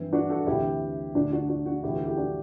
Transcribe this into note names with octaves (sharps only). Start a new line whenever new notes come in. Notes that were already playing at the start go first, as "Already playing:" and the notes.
Already playing: G2 E3 C4
D4 F#4
F#4 A4
D2 C3 E3 E4 G4
D2 D3 D4 F#4
D4 F#4
D4 F#4
D4 F#4
D2 C3 E3 E4 G4
F#4 A4
E4 G4
D4 F#4